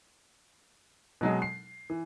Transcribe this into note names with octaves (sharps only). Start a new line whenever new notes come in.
B2 F#3 G#3
C7
E3